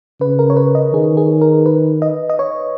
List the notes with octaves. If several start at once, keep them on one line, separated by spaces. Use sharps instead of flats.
C#3 B4
A#4
C#5
B4
D#5
D#3 G#4
G#4
A#4
B4
D#5
D#5
C#5